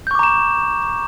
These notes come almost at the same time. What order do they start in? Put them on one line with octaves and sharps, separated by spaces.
G6 C#6 D6 A#5 E7